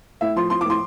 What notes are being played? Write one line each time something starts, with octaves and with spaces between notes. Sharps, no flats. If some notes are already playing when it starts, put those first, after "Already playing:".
A2 E5
F3 C6
F3 C6
D6
A2 C6